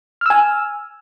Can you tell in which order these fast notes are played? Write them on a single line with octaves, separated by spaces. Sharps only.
F6 E6 G#5